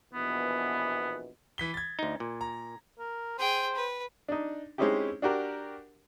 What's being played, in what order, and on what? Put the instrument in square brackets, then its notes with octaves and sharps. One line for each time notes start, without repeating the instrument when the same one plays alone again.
[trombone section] A#1 B2 E3 [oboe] B3
[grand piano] E3 B6 G7
G#6 A6
[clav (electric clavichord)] D2 D#4
A#2
[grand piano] A#5
[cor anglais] A#4
[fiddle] G#4 G5 [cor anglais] C5
[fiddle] B4
[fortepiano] D4 D#4
G#3 C4 C#4 D#4 E4 G4
D4 F#4 G4 A#4